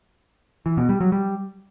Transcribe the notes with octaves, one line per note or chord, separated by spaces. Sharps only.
E3
B2
G3
F#3
G3